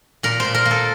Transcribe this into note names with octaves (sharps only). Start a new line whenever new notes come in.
A#2 A#4
A#2 C5
A#4
A#3
A4